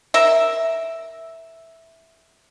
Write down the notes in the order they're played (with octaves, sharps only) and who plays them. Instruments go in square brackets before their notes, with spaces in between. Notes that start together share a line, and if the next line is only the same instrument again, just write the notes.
[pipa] A#4 E5